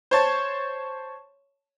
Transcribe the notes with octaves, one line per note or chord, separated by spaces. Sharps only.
C5 C#5 A5